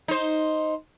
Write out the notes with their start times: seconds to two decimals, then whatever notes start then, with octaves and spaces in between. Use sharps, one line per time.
0.08 D#4 C5